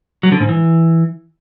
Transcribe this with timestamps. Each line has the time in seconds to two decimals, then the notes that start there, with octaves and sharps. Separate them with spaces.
0.23 F#3
0.32 D3
0.40 G#2
0.49 E3